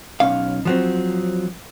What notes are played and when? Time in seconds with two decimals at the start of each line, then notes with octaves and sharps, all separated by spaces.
0.20 B1 C#4 F5
0.65 F3 F#3 C4